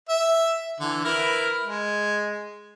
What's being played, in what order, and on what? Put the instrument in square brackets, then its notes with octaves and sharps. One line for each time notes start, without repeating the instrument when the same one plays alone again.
[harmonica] E5
D3 E3
E4 A#4 B4
G#3